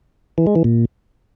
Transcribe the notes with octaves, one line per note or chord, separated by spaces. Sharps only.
E3
G#3
E3
A#2